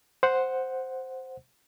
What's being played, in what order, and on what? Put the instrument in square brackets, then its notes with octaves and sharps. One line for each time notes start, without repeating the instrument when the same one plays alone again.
[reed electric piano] C5 F#5